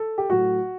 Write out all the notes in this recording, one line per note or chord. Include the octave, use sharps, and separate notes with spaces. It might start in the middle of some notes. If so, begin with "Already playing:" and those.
Already playing: A4
G4
A2 F#3 A3 F#4